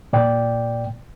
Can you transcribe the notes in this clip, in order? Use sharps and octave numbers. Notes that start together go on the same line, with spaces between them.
A#2 D5 G5